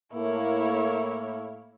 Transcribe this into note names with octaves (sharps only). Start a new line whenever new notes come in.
A2 A#3 E4 C#5